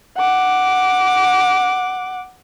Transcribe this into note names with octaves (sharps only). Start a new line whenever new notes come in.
F#5 D6